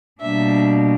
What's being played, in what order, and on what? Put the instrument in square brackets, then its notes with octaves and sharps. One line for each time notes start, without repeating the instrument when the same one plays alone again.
[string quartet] B2 G3 A#3 D4 E5